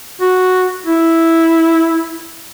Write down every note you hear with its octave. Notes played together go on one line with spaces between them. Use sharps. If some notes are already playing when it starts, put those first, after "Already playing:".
F#4
E4